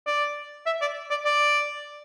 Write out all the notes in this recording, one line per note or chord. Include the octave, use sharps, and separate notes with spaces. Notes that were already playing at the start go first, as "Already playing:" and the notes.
D5
E5
D5
D5
D5